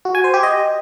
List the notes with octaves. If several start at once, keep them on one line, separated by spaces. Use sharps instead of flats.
F#4
G#5
C5
G4
D#5